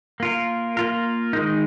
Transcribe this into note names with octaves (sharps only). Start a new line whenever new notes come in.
A#3 F4 A#4
A#3 F4 A#4
D#3 G#3 D#4